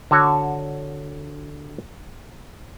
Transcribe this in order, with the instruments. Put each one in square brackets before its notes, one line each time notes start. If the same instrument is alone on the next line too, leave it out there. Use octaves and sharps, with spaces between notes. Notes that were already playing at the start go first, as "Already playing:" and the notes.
[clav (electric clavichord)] D3 F#4 C#5